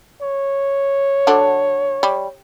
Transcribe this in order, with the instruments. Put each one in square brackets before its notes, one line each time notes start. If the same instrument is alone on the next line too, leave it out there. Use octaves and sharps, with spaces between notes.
[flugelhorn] C#5
[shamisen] D3 F#3 D4
G3